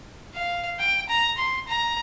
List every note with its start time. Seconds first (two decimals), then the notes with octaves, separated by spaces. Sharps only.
0.35 F5
0.79 G5
1.09 A#5
1.38 C6
1.68 A#5